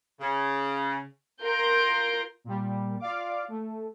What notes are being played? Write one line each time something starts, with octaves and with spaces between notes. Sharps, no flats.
C#3 G#4
F4 A#4 C6 G6 A#6 D7
A#2 G3
F4 D5 F5 D6
A3